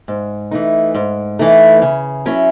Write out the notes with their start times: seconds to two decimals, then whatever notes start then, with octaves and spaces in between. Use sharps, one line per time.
0.08 G#2
0.51 E3 A3 D#4
0.94 G#2
1.39 E3 A3 D#4
1.82 C#3
2.26 F#3 C#4 E4